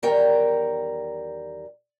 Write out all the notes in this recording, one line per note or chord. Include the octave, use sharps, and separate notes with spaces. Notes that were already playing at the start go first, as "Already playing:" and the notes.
E2 D#3 G3 A#4 C#5 G5